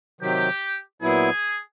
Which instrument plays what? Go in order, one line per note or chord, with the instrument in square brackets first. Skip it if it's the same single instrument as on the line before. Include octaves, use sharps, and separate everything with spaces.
[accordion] C3 D#3 F#3 [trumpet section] G4
[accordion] A#2 F#3 B3 E4 [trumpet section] G#4